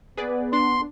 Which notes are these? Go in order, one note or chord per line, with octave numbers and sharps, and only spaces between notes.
B3 G#4 B4 D5
D4 C6